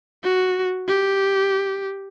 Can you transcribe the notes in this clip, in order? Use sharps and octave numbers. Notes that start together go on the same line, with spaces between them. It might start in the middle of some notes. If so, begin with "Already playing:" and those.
F#4
G4